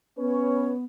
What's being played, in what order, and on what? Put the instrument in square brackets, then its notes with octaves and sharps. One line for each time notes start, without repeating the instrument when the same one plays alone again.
[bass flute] B3 [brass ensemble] C#4 B4 C#5